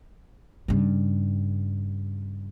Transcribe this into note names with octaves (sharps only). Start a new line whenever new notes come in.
G2 C#3